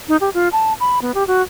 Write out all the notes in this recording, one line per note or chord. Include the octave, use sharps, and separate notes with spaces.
D#4
G4
F4
A5
B5
B3
G4
F#4